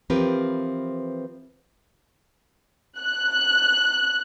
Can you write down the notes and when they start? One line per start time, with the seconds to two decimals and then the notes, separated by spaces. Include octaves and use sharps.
0.10 E3 F3 C4 G4 A#4 B4
3.00 F#6